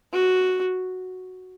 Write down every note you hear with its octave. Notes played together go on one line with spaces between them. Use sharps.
F#4